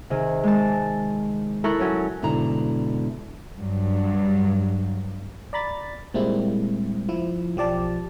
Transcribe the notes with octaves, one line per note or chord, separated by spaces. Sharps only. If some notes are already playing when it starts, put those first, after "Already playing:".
C3 D#3 G#4
G#3 A5
E4 A4 A#4 A#5 C#6 F#6
F#3 C#4 C#5
G#2 B2 D3 E4 A#5
G2 F#3
D5 A#5 B5 A6
A#2 G3 G#3 A#3 C4 E4
F3 E4
B1 F3 G4 D5 A5